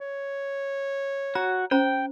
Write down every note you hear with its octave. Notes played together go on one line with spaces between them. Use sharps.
C#5
F#4 A#5
C#4 C5 G5 A#5